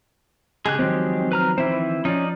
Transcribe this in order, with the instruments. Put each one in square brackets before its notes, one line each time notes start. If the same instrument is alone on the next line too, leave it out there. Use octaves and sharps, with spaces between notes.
[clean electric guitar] C#3 G#4 [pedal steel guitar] G#3 G4 F#6
[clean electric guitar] D#3 F3 [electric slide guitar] F#3 C4
[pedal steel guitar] B4 A#5 F6
[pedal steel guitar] E3 C5 [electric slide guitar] C4 E4
[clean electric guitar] F3 [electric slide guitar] C#4 [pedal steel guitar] D#4 D5